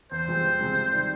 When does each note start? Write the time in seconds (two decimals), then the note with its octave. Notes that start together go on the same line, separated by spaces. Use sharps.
0.11 E2 C5
0.28 C3 F3 G#3 C4
0.44 E2
0.60 C3 F3 G#3 C4
0.76 C3
0.92 D#3 G3